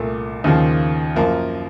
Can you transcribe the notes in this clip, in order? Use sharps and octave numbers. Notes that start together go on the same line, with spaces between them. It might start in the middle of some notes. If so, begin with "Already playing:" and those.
Already playing: C2 A#2 A3
D#2 C#3 F3
F#2 F3 A#3